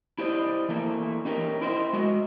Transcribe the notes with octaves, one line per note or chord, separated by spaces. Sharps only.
E4 G4 C5 D5 D#5
E3 A3 A#3
C#4 D#4 G4 A4 A#4
E4 A#4 C5 C#5 D#5 E5
G#3 F#4 D#5